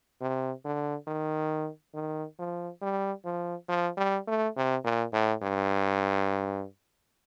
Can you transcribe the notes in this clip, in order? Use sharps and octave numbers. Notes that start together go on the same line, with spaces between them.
C3
D3
D#3
D#3
F3
G3
F3
F3
G3
A3
C3
A#2
A2
G2